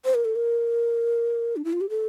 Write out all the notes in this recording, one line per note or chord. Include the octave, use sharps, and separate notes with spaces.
C5
A#4
A4
A#4
D4
E4
F4
G4
A4